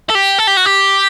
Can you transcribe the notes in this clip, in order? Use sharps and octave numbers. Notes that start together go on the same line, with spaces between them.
A4
G4
A4
G4
F#4
G4